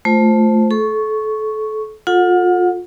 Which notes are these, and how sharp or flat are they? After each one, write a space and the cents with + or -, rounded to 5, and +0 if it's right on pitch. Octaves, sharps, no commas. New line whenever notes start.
A3 -5 F4 +0 C5 +0
A4 -30 C#6 +0
F4 +25 A4 +0 F#5 -25